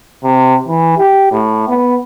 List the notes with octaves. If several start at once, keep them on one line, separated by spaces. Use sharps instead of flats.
C3
E3
G4
A2
B3